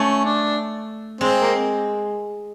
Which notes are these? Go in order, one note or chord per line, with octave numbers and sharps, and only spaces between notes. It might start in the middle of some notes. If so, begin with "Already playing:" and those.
Already playing: A3 C#4
D4
G#3 C4
A#3